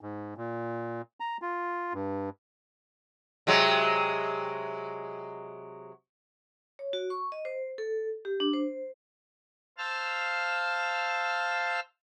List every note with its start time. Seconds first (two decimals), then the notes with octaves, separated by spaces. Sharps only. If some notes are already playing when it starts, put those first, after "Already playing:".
0.01 G#2
0.37 A#2
1.20 A#5
1.42 F4
1.94 G2
3.47 C3 F#3 G#3
6.79 C#5
6.93 F#4
7.10 C#6
7.32 D#5
7.45 C5
7.78 A4
8.25 G4
8.40 D4
8.53 C5
9.78 C5 F5 A5 E6 F6